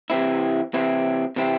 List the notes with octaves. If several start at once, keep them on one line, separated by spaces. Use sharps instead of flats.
C3 E3 C4 E4
C3 E3 C4 E4
C3 E3 C4 E4